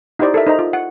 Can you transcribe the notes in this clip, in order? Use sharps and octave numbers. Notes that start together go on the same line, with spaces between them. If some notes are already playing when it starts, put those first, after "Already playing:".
D#4 E4 G4 C5 D5 D#5
A4 A#4 E5
D#4 C5 D#5 A#5
F4
F#5